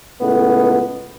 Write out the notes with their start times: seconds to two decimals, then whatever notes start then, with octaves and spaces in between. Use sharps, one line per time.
0.20 C#2 A2 B3